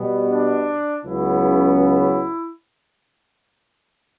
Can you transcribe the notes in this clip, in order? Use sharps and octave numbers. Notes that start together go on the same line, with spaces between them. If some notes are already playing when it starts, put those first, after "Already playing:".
Already playing: B2 G3 B3
D4
C#2 C#3 F#3 B3 E4
E4